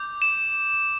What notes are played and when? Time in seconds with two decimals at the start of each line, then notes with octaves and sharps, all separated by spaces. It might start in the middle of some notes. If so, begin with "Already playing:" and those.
Already playing: D6 G6
0.22 E7